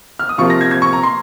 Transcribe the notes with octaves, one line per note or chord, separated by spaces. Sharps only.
F6
D#6
C3 F3 A#3 F4 C#6
A#6
G#6
G#6
C#6
A#5
C6